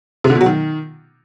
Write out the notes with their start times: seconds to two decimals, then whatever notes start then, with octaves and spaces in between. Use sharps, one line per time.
0.24 C3
0.30 D3
0.35 B2
0.41 F#3
0.46 D#3